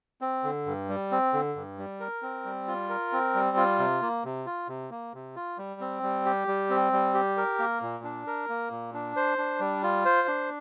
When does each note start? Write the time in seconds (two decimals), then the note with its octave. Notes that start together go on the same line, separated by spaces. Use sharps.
0.21 C4
0.44 D3
0.66 G2
0.89 G3
1.12 C4
1.33 D3
1.56 G2
1.78 G3
2.00 A#4
2.22 C4
2.45 G3
2.68 F4
2.89 A#4
3.13 C4
3.35 G3
3.57 F4
3.79 C3
4.02 A#3
4.24 C3
4.46 F4
4.68 C3
4.91 A#3
5.14 C3
5.36 F4
5.58 G3
5.81 C4
6.03 G3
6.26 G4
6.48 G3
6.70 C4
6.93 G3
7.14 G4
7.37 A#4
7.59 A#3
7.82 A#2
8.04 D4
8.27 A#4
8.49 A#3
8.71 A#2
8.94 D4
9.16 C5
9.38 D4
9.60 G3
9.83 F4
10.05 C5
10.28 D4